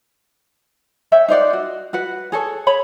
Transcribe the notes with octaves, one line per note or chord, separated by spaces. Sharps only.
C#5 E5 G5
D#4 C5 D5 F#5
F#4
F#4 B4 F#5
G#4 A4 C#5
G#4 C#5 B5